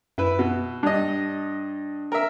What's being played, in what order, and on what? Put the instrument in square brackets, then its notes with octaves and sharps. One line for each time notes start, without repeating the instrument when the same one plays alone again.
[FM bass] F#2 [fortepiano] E4 B4
[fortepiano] B2
[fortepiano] G2 D#5 [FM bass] D4
[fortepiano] A#4 E5